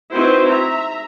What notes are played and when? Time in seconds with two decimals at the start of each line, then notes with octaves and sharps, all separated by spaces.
0.12 C4 D#4 E4 F#4 B4 C5
0.48 E5 A#5